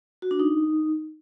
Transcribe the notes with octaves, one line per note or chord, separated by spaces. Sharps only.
F#4
D4
D#4